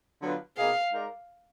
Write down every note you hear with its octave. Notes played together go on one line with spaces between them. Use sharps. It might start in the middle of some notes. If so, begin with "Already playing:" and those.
D3 F#3 B3 F4 B4
B2 A#3 D#4 G#4 F5
G#3 D#4 A#4 D5